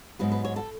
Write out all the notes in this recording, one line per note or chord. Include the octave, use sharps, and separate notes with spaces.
G#2 F#3 B3 B4
B4
C#5
A4